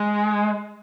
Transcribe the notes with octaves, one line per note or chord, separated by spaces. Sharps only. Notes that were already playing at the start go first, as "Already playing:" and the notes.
Already playing: G#3